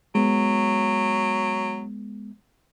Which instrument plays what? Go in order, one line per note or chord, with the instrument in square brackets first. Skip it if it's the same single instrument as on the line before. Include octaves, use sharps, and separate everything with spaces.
[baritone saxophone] F#3 [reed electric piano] G#3 B3